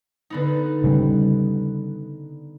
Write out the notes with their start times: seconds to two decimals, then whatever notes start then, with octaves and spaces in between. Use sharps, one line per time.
0.30 D3 B3 D#4
0.84 C#3 G3